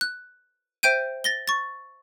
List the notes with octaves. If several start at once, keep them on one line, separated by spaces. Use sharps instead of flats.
F#6
C5 E5 G5 G6 D7 D#7
A6 A#6 G7
C#6 A6